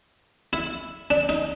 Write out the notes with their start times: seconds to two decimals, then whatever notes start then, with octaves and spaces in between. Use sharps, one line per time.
0.53 E4
1.10 D4
1.29 D#4